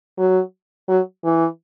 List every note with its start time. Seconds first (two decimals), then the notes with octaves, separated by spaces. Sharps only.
0.18 F#3
0.88 F#3
1.24 E3